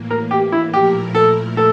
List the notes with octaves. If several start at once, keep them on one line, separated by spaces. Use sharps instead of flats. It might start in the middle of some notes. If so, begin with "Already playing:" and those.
Already playing: A2 E3 A#3
A#4
G4
E4
A#2 F3 A3 E4 G4 A#4
A4
A4